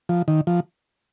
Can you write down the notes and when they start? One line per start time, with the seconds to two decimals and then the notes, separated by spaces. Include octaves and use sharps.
0.09 F3
0.28 D#3
0.47 F3